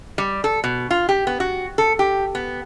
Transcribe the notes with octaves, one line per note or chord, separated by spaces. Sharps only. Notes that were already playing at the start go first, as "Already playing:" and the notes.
G3
A4
B2
F4
G4
B3
F#4
A4
G4
B3